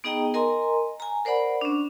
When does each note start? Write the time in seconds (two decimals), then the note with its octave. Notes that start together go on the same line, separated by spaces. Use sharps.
0.04 B3 D#4 G#4 D#5 G5 A#5
0.34 A#4 D#5 G#5 A#5 C6
1.00 G#5 A#5
1.25 A#4 C5 D5 F#5 B5
1.61 C#4 D4